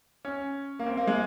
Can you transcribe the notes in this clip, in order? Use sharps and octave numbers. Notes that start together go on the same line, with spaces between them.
C#4
A#3
C4
A#3
G#3